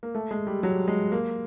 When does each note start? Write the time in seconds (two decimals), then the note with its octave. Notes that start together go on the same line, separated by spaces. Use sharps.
0.03 A#3
0.15 A3
0.31 G#3
0.47 G3
0.63 F#3
0.88 G#3
1.12 A#3